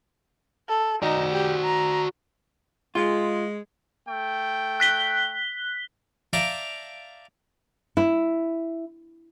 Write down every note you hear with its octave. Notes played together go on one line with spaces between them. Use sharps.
A4
D#4 F#4 D5
G4
A#5
G#3 F4
A3 G5
F#6 B6 G7
D5 E5 F5 G5 A5 A#5
E4